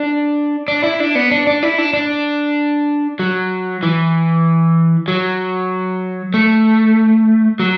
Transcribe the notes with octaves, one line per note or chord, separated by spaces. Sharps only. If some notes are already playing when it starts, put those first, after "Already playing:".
Already playing: D4
D4
E4
D4
B3
D4
D4
E4
D4
D4
F#3
E3
F#3
A3
F#3